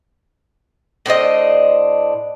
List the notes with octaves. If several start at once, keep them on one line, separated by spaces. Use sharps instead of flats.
A2 D4 C5 D#5